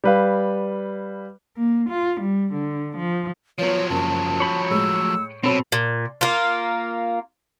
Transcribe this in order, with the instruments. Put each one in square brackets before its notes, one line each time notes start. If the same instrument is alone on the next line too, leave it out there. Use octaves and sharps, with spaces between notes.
[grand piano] G3 B4 F5
[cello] A#3
F4
G3
D3
F3
[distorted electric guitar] F3 F#3 [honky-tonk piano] B3 F4 [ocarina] C#5
[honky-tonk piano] F#1 A#3 [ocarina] A5
[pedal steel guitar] C#5 B5 [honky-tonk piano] G6
[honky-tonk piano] A2 G#3 [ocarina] E6
[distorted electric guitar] B2 [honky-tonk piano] F#3 B5 F7 [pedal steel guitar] C4 A4 [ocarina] C#5
[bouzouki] A#2
A#3 F4